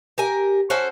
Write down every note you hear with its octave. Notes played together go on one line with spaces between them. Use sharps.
G4 A#4 G#5
C#4 F#4 A4 C5